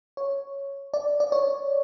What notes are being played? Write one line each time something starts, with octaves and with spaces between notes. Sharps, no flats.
C#5
D5
D5
C#5